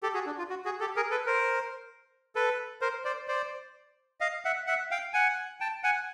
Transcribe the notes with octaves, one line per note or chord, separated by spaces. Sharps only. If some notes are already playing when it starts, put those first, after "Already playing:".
G4 A4
F#4 G#4
D4
F4
F#4
F#4 G#4
G4 A4
G#4 A#4
A4 B4
A#4 C5
A4 B4
A#4 C5
C5 D5
C5 D5
D#5 F5
E5 F#5
E5 F#5
F5 G5
F#5 G#5
G5 A5
F#5 G#5